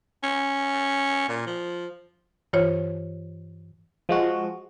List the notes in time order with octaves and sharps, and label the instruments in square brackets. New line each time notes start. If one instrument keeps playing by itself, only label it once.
[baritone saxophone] C#4
A#2
F3
[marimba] G2 E3 F4 C5 C#5
[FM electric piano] F3 G#3 F#4